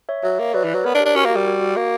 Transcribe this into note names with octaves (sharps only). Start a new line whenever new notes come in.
C#5 E5
F#3 C#5 E5
A#3
F#3 B4 D5
E3
F#3
B3 A#4 C#5
D4
G4
D4
C#4 F#4 A#4
A#3
F#4
G3
F#4
F#4
A#3